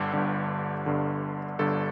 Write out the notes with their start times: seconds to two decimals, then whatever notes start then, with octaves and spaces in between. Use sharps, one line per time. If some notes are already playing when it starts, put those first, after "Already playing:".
Already playing: G1 G2 D3 G4
0.13 G1 G2 D3
0.86 G1 G2 D3
1.59 G1 G2 D3 A4